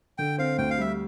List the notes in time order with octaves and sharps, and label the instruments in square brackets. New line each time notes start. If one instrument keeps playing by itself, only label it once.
[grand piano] D3 [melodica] G5
[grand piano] C4 [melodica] F5
[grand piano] D2 [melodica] G5
[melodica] F5
[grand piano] G3 [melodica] E5